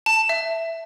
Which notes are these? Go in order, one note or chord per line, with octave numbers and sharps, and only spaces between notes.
A5
E5